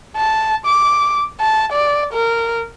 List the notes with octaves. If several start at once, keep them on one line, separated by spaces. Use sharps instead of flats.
A5
D6
A5
D5
A#4